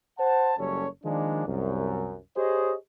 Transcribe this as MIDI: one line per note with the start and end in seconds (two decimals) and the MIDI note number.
0.18 0.53 72
0.18 0.53 78
0.18 0.53 81
0.57 0.86 30
0.57 0.86 42
0.57 0.86 55
0.57 0.86 61
0.57 0.86 69
0.57 0.86 73
1.04 1.43 51
1.04 1.43 53
1.04 1.43 56
1.04 1.43 58
1.04 1.43 62
1.46 2.16 36
1.46 2.16 42
2.35 2.73 67
2.35 2.73 68
2.35 2.73 72
2.35 2.73 73
2.35 2.73 75